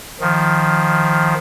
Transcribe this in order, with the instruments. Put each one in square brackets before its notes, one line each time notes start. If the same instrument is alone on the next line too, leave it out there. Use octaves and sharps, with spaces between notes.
[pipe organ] D#3 F3